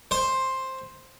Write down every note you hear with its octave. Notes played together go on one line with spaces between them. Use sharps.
C5